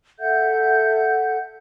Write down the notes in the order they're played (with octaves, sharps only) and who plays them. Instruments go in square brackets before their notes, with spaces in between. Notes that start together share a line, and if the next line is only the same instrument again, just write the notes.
[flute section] A4 E5 F#5 G6